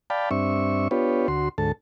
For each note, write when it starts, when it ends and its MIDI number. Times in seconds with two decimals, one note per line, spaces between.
0.10 0.29 74
0.10 0.29 77
0.10 0.29 79
0.10 0.29 81
0.10 0.29 83
0.31 0.88 43
0.31 0.88 60
0.31 0.88 62
0.31 0.88 76
0.31 0.88 85
0.91 1.27 59
0.91 1.27 62
0.91 1.27 65
0.91 1.27 67
0.91 1.27 71
0.91 1.27 73
1.28 1.49 38
1.28 1.49 66
1.28 1.49 84
1.58 1.72 38
1.58 1.72 44
1.58 1.72 69
1.58 1.72 81